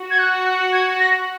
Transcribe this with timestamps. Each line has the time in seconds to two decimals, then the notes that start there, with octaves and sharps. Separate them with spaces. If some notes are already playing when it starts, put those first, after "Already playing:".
Already playing: F#4
0.11 G#6
0.19 F#6
0.46 F#6
0.73 G#6
1.00 A#6